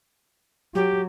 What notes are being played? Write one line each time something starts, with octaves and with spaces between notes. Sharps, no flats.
F#3 G4